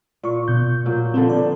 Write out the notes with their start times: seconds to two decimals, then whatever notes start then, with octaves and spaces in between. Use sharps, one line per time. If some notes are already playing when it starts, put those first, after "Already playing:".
0.24 A#2 D5 C#6
0.48 B2 G6
0.86 A#2 F#3
1.14 D3 F3 B3 C4
1.29 D5